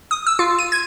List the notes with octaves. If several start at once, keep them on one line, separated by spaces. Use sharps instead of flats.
D#6
E6
F4
D#7
G#6